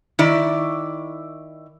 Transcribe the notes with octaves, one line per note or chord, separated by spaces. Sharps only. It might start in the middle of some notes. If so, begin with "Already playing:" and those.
D#3 E4 D5